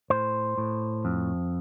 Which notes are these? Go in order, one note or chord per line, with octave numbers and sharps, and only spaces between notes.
A2 C5
A2
F2